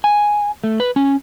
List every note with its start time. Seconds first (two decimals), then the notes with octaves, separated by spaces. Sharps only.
0.04 G#5
0.64 A3
0.80 B4
0.96 C#4